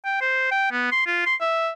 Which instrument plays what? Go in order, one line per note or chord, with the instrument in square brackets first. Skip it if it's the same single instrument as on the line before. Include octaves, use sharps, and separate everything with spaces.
[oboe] G5
C5
G5
B3
C6
F4
C6
E5